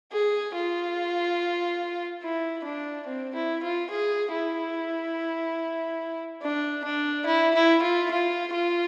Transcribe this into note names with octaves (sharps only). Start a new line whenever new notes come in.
G#4
F4
E4
D4
C4
E4
F4
G#4
E4
D4
D4
E4
E4
F4
F4
F4